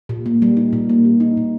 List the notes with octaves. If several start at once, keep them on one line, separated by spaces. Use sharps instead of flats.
A#2
A#3
G3
D#4
A#2
A#3
G3
D#4
A#2